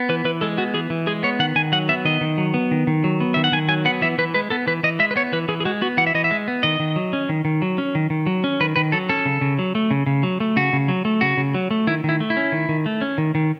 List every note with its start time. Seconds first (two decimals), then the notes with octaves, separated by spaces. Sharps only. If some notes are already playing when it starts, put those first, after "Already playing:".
Already playing: B3
0.09 E3 B4
0.25 E3 B4
0.41 G#3 A4
0.57 B3 F#4
0.74 E3 G#4
0.90 E3
1.07 G#3 G#4
1.23 B3 C#5
1.39 D#3 F#5
1.56 D#3 G#5
1.72 F#3 F#5
1.89 B3 E5
2.05 D#3 D#5
2.21 D#3
2.38 F#3
2.54 B3
2.71 D#3
2.87 D#3
3.04 F#3
3.20 B3
3.34 D#3 E5
3.44 F#5
3.52 D#3 G#5
3.68 F#3 G#5
3.85 B3 F#5
4.01 E3 E5
4.18 E3 B4
4.34 G#3 B4
4.50 B3 A4
4.67 E3 B4
4.83 E3 D#5
4.99 G#3 E5
5.11 B4
5.16 B3 C#5
5.33 E3 B4
5.48 E3 G#4
5.60 G#4
5.65 G#3 F#4
5.82 B3 F#4
5.97 E3 F#5
6.07 E5
6.15 E3 D#5
6.24 E5
6.31 G#3
6.48 B3
6.63 D#3 D#5
6.80 D#3
6.96 F#3
7.13 C#4
7.29 D#3
7.45 D#3
7.62 F#3
7.78 C#4
7.95 D#3
8.10 D#3
8.26 F#3
8.44 C#4
8.60 D#3 B4
8.76 D#3 B4
8.92 F#3 A4
9.09 C#4 A4
9.25 C#3
9.41 C#3
9.59 F#3
9.75 A3
9.91 C#3
10.06 C#3
10.23 F#3
10.40 A3
10.56 C#3 F#4
10.73 C#3
10.88 F#3
11.05 A3
11.21 C#3 F#4
11.37 C#3
11.54 F#3
11.71 A3
11.87 D#3 E4
12.04 D#3 E4
12.20 A3
12.30 E4
12.37 C#4
12.52 D#3
12.69 D#3
12.86 A3
13.01 C#4
13.18 D#3
13.35 D#3